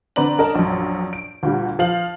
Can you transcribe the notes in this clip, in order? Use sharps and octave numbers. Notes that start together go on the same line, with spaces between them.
D3 C4 B4 D5 A#5 F#7
C#4 D4 A#4 D#5 A5 A#5
A#1 F#2
D7
D2 A#2 G3
F3 F5 F#7